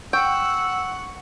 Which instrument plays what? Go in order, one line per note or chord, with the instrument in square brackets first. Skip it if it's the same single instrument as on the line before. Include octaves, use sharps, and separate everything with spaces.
[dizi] F#5 [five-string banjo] G5 [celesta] C#6 [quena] E6